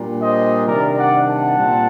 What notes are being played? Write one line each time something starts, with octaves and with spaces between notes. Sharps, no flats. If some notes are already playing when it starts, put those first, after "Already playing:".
Already playing: A#2 G3 D4
C5 D#5
C3 D#3 G3 D4 A#4 D5
D5 F#5
F#5 A5
A#2 G3 C4